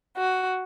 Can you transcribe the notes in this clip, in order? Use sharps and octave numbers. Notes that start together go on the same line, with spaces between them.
F#4